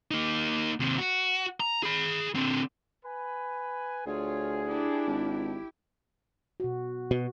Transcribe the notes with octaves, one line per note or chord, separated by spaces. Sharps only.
A#3 D#4
D#2 C3
F#4
A#5
G#4 B5
D3 C4
B4 G#5 B5
D2 F4 G#4 C#5
D4 E4 G4
G#1
B2 F#4
B2 F#4